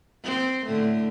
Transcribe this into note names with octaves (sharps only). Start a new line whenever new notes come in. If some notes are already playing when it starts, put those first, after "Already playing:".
C4
A2 D3 A3